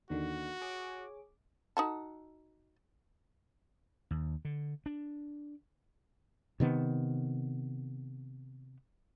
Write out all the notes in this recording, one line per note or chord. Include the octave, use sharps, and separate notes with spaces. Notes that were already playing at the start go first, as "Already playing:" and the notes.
D#2 D3 D#3 F#4
G#4 C#5 D6
D#4 F#4 A4
D#2
D3
D4
C3 D#3 B3